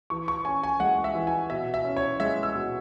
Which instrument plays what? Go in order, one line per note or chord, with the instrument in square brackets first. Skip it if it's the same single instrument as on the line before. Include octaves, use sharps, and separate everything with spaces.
[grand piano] E3 C#6
C#6
C#4 G#5
G#5
G#3 F#5
E5
E3
G#5
B2 E5
E5
C#4
C#5
G#3 E5
E6
B2